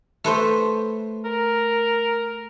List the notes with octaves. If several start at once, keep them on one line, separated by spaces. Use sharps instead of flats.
A3 B4 C5
A#4